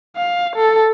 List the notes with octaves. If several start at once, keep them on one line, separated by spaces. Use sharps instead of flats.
F5
A4